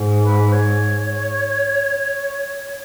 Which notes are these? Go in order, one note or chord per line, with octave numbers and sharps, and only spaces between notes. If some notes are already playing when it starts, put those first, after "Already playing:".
Already playing: G#2
B4
C#5